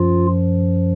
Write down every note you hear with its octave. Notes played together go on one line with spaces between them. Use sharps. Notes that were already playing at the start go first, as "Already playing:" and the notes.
Already playing: F#2 F3 F4